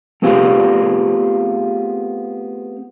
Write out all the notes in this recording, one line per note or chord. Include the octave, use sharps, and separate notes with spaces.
A3 B3 C4 F4 G4 G#4